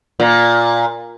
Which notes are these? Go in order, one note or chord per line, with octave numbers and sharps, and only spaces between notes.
A#2